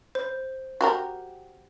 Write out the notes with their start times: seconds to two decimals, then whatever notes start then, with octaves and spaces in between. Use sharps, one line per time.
0.15 C5
0.81 F#4 G4 A#4